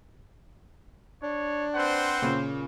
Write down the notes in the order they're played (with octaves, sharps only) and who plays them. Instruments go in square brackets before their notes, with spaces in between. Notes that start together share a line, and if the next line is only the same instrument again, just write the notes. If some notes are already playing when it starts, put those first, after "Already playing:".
[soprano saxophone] D4 [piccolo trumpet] C#5
[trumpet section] C4 B4 F#5 [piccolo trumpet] C5
[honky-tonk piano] A#2 C#3